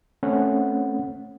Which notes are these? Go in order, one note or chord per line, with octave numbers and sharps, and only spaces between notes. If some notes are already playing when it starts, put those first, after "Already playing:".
A3 C4 C#4 F#5